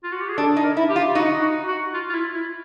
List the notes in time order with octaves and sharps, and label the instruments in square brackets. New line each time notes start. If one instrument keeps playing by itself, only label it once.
[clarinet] F4
F#4
G4
G#4
[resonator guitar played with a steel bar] D4 [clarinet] A4
[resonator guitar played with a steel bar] D#4
[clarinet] A#4
[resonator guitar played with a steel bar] E4
[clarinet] G4
[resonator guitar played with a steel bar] F4
[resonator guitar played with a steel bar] D#4 [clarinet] F#4
[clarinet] F#4
F#4
F4
F4
E4
E4